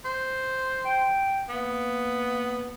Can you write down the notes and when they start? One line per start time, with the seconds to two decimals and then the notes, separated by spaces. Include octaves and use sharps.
0.05 C5
0.85 G5
1.49 A#3 B3